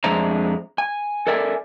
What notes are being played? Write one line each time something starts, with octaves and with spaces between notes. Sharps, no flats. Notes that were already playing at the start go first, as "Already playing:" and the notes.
F2 G#3 D4 C5 E5 A#5
G#5
A4 A#4 D5 E5 G5 G#5